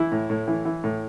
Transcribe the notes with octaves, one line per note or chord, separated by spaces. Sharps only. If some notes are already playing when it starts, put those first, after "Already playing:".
Already playing: E3 E4
A2
A2
E3
E3
A2